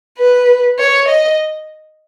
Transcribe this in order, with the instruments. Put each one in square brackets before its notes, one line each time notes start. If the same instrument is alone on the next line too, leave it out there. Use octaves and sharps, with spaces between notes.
[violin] B4
C#5
D#5